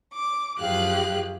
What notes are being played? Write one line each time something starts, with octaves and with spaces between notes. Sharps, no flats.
D6
F#2 F3 G4 G#4 F5 F#6